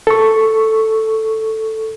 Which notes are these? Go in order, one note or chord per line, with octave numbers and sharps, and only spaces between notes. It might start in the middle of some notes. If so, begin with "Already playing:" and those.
A4 C#6